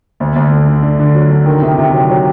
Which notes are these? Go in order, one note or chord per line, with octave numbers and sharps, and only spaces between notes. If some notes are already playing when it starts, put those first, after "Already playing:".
D2
D2
D3
D3
D3
D3
F#3
D3
D#3
C3
C3
F#3
F#3